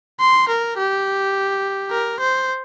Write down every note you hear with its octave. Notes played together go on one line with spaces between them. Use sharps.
C6
A#4
G4
A#4
C5